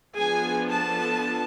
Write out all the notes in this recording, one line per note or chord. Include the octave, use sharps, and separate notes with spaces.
F3 B3 D4 G#4 G#5
A4 A5